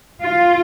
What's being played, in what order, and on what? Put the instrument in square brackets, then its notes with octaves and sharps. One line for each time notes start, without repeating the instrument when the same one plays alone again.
[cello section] F4